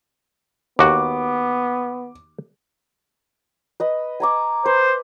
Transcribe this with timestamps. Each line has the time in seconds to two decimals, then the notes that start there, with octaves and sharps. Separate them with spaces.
0.79 D#2 B3 F#4 D6
3.80 B4 D#5 B5
4.20 G#5 A#5 D6
4.66 B4 C5